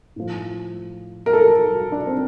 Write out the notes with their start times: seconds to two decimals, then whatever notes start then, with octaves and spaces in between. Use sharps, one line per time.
0.16 A2 F3
1.26 A#4
1.33 A4
1.92 D4
2.07 C4